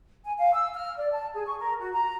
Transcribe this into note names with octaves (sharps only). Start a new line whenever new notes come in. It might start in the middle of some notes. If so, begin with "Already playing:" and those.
G#5
F5
E6
F6
D5
A5
G#4
C#6
A#4
F#4
A#5